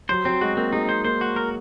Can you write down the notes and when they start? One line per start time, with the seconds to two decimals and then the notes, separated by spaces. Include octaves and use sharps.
0.09 F#3 C5
0.25 F#3 C4
0.41 G#3 F#4
0.57 A#3 C4
0.72 G#3 D#4
0.89 C5
1.05 A#3 C5
1.21 F#4
1.36 A#4